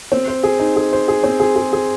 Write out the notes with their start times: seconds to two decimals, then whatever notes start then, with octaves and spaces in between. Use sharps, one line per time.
0.12 C4
0.28 C5
0.43 G#4
0.59 D#4
0.76 G#4
0.92 C5
1.08 G#4
1.24 C4
1.40 G#4
1.56 G#4
1.73 G#4